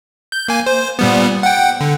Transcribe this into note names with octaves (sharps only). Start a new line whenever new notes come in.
G6
A#3 G#5
C5
A#2 G3 B3
F#5 G5
D3